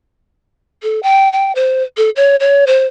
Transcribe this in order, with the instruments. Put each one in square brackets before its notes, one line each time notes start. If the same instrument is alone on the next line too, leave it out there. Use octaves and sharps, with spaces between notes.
[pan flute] A4
G5
G5
C5
A4
C#5
C#5
C5